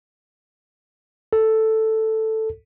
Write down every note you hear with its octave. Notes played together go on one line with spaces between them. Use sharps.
A4